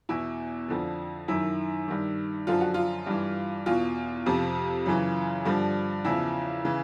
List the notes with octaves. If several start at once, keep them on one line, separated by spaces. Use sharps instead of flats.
E2 B2 E4
F2 D3 F3
F#2 D#3 E4
G2 D#3
F#2 D3 F3 F4
F#4
F4
G2 E3
E2 B2 F4
F2 C3 F3
F#2 C#3 E3
G2 D3 F3
E2 C#3 F3 E4
C#3 E3